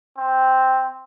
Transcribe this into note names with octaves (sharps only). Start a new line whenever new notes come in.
C4